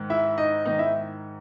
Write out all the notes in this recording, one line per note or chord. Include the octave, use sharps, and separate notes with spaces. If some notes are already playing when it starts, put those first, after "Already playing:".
Already playing: G#2 D#3
E4 E5
D#4 D#5
G#2 D#3 D#4 D#5
E4 E5